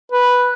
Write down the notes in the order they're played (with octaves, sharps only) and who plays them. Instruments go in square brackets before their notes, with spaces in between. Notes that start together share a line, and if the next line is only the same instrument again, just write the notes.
[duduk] B4